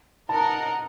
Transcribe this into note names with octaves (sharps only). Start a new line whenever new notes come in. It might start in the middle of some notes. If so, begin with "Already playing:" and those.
D#4 A#4 D#5 F#5 A5